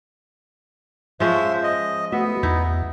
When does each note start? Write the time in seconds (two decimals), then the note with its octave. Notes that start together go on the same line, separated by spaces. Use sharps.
1.20 F3 G#3 C#4 C5 E5
1.63 D#5
2.12 A3 B3 F#4 E5
2.43 E2 D#4 E4